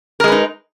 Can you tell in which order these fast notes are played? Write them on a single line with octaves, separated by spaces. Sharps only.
A#4 G#3 B4 D#4